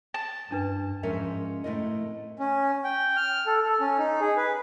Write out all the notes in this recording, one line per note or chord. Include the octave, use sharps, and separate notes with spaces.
A5
G2 C#4 D4 B4
G#2 F3 C#4 A#4 E5
A2 C3 A3 E4 A#4 D#5
C#4
G5
F6
A4
A4
C#4
D#4
G#4
B4